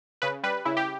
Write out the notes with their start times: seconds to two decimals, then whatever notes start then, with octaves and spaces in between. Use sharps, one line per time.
0.22 C#3 B4
0.43 G3 B4
0.65 C#3 E4
0.77 G4